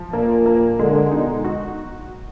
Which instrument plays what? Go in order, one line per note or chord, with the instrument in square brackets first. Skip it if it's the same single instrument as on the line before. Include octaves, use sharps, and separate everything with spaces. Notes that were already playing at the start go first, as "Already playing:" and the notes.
Already playing: [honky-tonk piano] F3
[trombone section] A#2 [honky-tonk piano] A#3
[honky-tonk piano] A#3
[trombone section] D3 [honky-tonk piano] G#3
[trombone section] B2 [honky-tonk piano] D#4
[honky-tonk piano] F#4